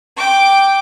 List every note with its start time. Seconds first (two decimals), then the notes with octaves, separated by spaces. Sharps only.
0.17 G5 D6